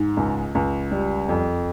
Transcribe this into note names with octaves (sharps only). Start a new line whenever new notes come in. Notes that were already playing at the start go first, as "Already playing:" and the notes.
Already playing: G#2
C#2
C#2
G3
F2